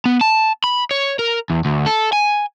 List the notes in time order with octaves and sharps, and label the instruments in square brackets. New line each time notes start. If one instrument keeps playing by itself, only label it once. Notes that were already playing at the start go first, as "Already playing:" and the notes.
[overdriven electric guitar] B3
A5
B5
C#5
A#4
E2
D2
A4
G#5